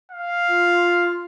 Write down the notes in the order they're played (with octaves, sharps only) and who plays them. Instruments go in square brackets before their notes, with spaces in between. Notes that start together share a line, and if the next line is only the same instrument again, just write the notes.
[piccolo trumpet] F5
[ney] F4